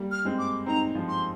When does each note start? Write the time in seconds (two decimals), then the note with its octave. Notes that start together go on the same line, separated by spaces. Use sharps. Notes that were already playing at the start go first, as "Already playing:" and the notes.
Already playing: G3 A#3
0.12 F6
0.25 G#3 C4
0.39 D6
0.66 C4 D#4 A#5
0.95 F3 G#3
1.09 C6